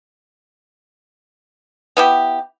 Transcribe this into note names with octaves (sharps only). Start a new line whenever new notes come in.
B3 E4 G4